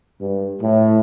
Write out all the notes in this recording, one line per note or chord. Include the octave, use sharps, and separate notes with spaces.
G2
A2